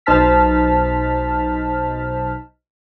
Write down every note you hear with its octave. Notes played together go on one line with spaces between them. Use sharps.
B1 D#4 C5 A5 F6 B6